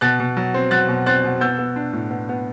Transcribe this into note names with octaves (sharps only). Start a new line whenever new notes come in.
B2 F#6 A6
B2
F#3
C4
F#3 F#6 A6
B2
C4 F#6 A6
B2
B3 E6 G6
B3
D4
A2
B3
B3